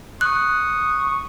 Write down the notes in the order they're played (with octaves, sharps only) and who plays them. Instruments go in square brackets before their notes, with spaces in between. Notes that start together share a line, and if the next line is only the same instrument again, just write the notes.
[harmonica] C#6 D#6 [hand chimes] F#6